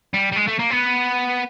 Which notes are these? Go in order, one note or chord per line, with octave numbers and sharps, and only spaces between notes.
G3
G3
G#3
A3
A#3
B3